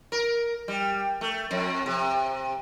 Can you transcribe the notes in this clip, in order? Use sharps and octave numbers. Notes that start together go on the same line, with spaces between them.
A#4
G3
A3
F2
C3